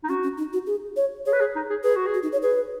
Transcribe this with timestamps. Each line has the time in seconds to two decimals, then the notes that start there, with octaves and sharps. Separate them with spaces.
0.04 D#4
0.09 C#4 F#4
0.23 C#4
0.38 D#4
0.53 F#4
0.67 G#4
0.96 C#5
1.26 G#4 C#5
1.33 B4
1.40 G#4
1.56 D#4
1.70 G#4
1.84 G#4 B4
1.96 F#4
2.07 G#4
2.14 F#4
2.23 D#4
2.32 C#5
2.43 G#4 B4